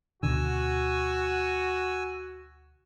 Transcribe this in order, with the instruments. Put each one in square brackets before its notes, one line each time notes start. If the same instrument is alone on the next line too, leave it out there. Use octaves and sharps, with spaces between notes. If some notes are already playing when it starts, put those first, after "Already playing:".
[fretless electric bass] D2 B2 D3 [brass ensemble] F#4 [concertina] G#5 E6